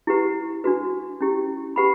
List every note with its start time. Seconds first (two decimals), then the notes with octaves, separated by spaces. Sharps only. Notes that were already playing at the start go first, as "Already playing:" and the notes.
0.07 E4 G4 B4 F#5
0.64 D4 F#4 B4
1.21 C#4 E4 G4
1.76 G4 B4 F#5 B5